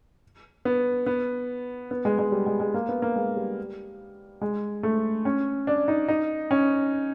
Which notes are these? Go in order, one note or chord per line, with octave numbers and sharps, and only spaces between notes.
B3
B3
B3
G#3
G#3
G3
G#3
G#3
A#3
B3
A#3
G#3
G3
G#3
A3
C#4
D4
D#4
D#4
C#4